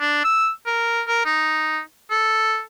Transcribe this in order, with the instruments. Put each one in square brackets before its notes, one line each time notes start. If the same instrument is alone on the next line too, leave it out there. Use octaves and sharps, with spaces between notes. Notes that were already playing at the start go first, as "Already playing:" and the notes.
[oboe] D4
E6
A#4
A#4
D#4
A4